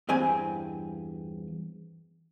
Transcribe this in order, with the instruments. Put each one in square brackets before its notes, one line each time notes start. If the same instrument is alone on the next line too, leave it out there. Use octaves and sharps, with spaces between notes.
[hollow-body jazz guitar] E2 G2 C4 G4 G#5